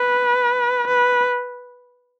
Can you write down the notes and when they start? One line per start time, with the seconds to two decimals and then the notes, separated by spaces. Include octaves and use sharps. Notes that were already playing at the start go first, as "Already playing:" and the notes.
Already playing: B4
0.87 B4